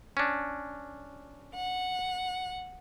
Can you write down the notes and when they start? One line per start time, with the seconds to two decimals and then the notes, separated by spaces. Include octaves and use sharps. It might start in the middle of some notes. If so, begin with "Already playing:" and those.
0.17 C#4 D4
1.55 F#5